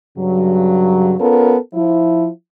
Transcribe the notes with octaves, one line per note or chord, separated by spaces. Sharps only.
G2 C#3 F#3
B3 C#4 F4 A4 A#4
F3 E4